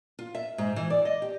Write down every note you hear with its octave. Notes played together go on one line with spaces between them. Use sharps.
F4
E5
G#2
E3
D5
D#5
G4